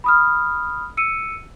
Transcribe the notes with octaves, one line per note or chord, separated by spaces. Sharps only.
B5 D#6 F6
E6 C#7 D#7